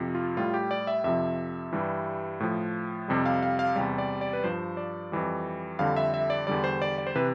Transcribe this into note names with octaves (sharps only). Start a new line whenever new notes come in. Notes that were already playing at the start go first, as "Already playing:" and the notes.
Already playing: F2 C3 F3
F4
A2 G3 F4
G4
D5
E5
F2 C3 F3 E5
G2 E3 G3
A2 F3
F2 C3 G3
F5
F5
F5
E2 C3 G3
D5
D5
B4
G2 F3 C5
D5
F2 E3 G3
F2 D3 G3 F5
E5
E5
D5
E2 D3 G3 D5
C5
D5
D5
C5
C3 E3 B4